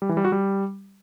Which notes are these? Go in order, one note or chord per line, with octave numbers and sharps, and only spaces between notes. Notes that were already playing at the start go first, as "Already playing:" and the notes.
G3
E3
G3
F#4
G3